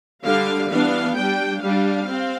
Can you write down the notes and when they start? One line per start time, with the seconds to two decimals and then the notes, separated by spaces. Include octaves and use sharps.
0.24 D3 G3 D4 F5
0.69 E3 B3 D4 F5
1.16 G3 D4 G5
1.62 G3 D4 F5
2.07 C4